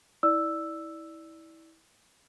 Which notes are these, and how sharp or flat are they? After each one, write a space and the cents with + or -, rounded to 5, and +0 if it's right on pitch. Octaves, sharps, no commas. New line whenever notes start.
E4 -25 D5 +5 E6 +0